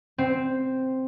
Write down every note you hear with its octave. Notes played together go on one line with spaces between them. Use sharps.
C4